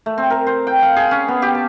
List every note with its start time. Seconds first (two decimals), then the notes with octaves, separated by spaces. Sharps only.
0.06 A3
0.18 C4
0.30 A#4
0.47 C5
0.67 G5
0.82 F5
0.96 G#4
1.11 C#4
1.28 B3
1.42 G4
1.55 A5